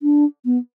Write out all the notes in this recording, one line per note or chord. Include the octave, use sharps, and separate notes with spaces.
D4
B3